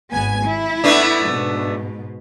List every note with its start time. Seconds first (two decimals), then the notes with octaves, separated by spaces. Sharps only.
0.12 G#1 B3 G#5
0.46 E4
0.84 A3 B3 D4
1.26 G#2 B2